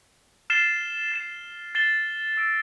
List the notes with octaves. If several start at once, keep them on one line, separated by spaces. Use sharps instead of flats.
F6 A6 C7 E7 G7
A6 C7 E7
A6 C7 E7 G7
E6 A#6 D7